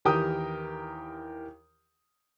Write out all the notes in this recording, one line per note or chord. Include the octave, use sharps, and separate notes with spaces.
D#2 E3 G4 A#4 G5 D#6